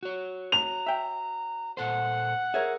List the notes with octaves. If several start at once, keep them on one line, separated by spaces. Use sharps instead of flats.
F#4 C#5
A#5 F7
E5 G5
A#2 A4 C5 F#5
G#4 A#4 C#5 E5